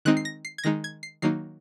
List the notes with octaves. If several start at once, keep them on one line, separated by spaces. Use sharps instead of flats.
D#3 G#3 C4 D#4 F#6
C7
A#6
C7
G#6
D#3 G#3 D#4 A#6
G#6
C7
D#3 F#3 A#3 D#4 C7